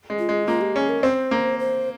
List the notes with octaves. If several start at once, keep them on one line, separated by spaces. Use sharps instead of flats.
G#3
F4
G#3
A#3 F4
G4
C#4 G#4
A#4
C4 C5
A#3
C5